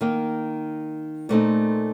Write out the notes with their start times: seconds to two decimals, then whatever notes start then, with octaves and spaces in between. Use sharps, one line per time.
0.01 D#3 A#3 D#4
1.29 A#2 A3 C4 D#4